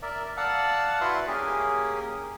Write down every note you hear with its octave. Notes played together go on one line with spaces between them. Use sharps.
A#4 D5 E5
D5 F5 F#5 A5 E6
E4 F#4 B4 E5 C6
A#3 C#4 G4 G#4 A#4